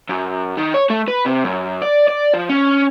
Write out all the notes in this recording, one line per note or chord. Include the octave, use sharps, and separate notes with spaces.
F#2
D#3
C#5
A3
B4
C3
F#2
D5
D5
F3
C#4